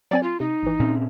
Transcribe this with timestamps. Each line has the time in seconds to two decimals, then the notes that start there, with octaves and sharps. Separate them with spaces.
0.11 F#3 C4 D5 G#5
0.23 F4
0.40 C3 D#4
0.63 G#1 E3
0.80 A#2 C4 C#4